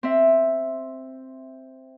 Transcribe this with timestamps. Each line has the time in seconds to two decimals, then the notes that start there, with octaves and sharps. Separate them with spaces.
0.03 C4 E5